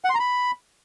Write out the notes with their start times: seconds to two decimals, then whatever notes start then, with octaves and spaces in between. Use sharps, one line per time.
0.05 F#5
0.10 C6
0.15 A#5
0.20 B5